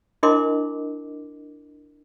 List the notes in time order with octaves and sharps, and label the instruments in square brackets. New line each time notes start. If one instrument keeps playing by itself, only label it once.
[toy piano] D4 E4 A#4 D#5 C6 D6